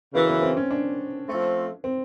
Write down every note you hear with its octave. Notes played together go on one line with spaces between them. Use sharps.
F#2 C#3 E3 B3
B3
C4
C#4
D4
F3 A3 C4
C4